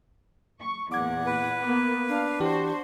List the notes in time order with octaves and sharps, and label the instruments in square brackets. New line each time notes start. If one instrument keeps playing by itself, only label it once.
[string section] C#6
[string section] E2 A#2 [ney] F#5 [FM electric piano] D6 G#6
[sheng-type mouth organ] B4
[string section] A#3 B3
[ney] D4 [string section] F5
[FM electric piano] E3 G4 [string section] F#4 C5